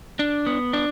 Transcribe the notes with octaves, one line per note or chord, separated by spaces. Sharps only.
D4
B3
D4